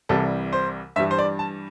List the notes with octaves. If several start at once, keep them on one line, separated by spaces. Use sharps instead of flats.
C2 C3 E3 G3 A4
C5
G2 E3 G3 E5
C5
D5
A5